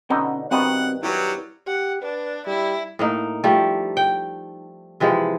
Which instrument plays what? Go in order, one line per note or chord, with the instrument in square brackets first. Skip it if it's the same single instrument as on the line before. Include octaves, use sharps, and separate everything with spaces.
[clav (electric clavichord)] B2 D3 D#4 [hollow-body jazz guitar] C#4 G5
[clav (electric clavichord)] G2 D#3 B3 [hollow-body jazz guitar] C4 F#4 D#5 [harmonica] F#5
[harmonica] F#3 G3 [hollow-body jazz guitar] E4 G4 B4
[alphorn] G4 [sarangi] F#5
[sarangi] D4 [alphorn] B4
[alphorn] G3 [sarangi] E4
[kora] A2 A#3 D#4
F3 G3 A3
G5
C3 E3 F3 G#3